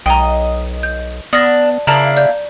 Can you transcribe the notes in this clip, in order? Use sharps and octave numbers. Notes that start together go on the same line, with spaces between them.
B1 D#5 G5 A#5
G6
B3 D4 D#6 F6 A#6
C#3 A#3 D4 E4 A5 A#5
D5 G6